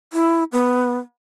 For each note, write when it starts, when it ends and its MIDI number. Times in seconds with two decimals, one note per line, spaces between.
0.13 0.44 64
0.52 0.98 59